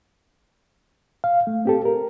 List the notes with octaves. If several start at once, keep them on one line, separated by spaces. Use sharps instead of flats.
F5
A3
C4 G4 A4
A#4